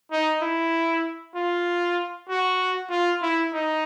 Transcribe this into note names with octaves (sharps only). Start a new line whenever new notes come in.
D#4
E4
F4
F#4
F4
E4
D#4